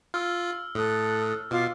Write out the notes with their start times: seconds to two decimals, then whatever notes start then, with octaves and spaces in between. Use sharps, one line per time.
0.14 F4 E6 F6
0.75 A2 A4 D#6 F#6
1.51 B2 F4 D6 F6